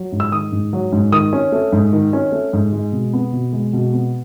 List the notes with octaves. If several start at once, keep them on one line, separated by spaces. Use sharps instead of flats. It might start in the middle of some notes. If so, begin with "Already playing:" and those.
Already playing: F#3
G#2
E6
D#3 D#6
G#2
F#3
G#2
D#3 D#6
C#4
A3
G#2
D#3
C#4
A3
G#2
G#3
B2
B3
B2
G#3
B2
B3